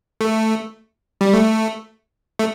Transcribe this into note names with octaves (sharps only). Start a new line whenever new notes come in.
A3
G3
A3
A3